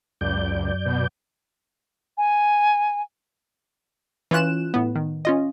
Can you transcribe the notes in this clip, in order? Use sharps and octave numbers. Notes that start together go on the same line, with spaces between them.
C#2 F#2 D5 G6
B2
G#5
E3 C#4 F4 F#6 E7
A2 B3
D#3
C#4 F4 D#5